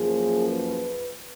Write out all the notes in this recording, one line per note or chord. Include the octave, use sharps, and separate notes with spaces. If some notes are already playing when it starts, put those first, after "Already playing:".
Already playing: F#2 F3 A#3 G#4
B4